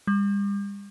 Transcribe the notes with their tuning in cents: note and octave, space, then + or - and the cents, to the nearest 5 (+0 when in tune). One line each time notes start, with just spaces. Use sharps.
G3 +40